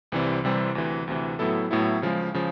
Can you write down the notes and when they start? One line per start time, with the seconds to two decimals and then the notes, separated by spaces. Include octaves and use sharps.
0.12 C2 C3 E3 G3 C4
0.44 C2 C3 E3 G3 C4
0.75 D2 C3 E3
1.08 D2 C3 E3
1.39 A2 F#3 B3 E4 A4
1.71 A2 F#3 B3 E4 A4
2.02 C#3 F3 G#3
2.34 C#3 F3